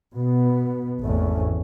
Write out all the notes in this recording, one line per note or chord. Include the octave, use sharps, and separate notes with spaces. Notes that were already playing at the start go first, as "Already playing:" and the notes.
B2 B3
G#1 E2 A3 C#4